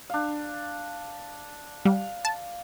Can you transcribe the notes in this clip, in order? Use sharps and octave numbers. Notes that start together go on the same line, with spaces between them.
D4 F5
G3 F5
A5